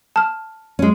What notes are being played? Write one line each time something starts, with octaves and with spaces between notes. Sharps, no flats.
A5 F6
G#3 C#4